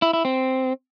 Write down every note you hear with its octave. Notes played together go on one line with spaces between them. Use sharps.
E4
E4
C4